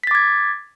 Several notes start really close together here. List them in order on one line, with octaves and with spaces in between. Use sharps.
B6 A6 D6 G#6